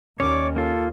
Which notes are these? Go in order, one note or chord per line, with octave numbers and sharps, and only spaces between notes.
D#2 C#4 C#5 D5 D6
A#3 F4 A4